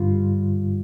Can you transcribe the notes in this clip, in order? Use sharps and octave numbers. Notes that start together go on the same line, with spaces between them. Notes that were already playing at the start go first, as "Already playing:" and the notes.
Already playing: G2 D3 G3 F4